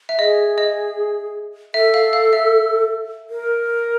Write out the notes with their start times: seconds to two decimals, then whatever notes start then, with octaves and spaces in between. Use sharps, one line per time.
0.09 E5
0.19 G#4 D#5
0.58 D#5
1.74 A4 E5
1.94 F5
2.13 F5
2.33 E5
3.30 A#4